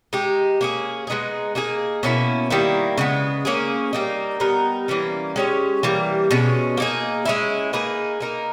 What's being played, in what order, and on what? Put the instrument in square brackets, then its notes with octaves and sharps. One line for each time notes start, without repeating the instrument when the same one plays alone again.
[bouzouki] G#3 D#4 G4
A#3 C#4 G#4
G#3 B3 D#4 G#4
A#3 D#4 G#4
B2 A#3 C#4 E4
D#3 G3 A#3 E4
C#3 G#3 B3
A#3 C#4 G#4
G3 A#3 D#4
G3 B3 D#4 A#4
E3 G3 A#3 C#4
G#3 C#4 G4 C#5
E3 G3 A#3
B2 G#3 C#4
A#3 D#4 G#4
G#3 C#4 E4
A#3 D#4 G#4 B4
A#3 D#4 A#4